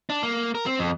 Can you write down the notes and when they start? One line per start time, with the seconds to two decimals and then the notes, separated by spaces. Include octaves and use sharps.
0.10 D4
0.23 A#3
0.55 A#4
0.66 C4
0.79 F2